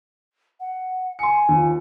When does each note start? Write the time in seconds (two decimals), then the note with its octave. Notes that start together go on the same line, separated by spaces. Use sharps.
0.60 F#5
1.19 G#5 C6 C#7
1.49 D#2 F3